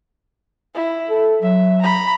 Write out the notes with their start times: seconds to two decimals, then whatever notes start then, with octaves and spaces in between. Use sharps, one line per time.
0.75 E4
1.09 A4
1.42 F#3 E5
1.82 A#5 B5